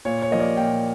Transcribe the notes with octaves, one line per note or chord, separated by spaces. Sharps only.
A#2 C#5
C#5
F3 A#3 D#5
D5
A#2 G5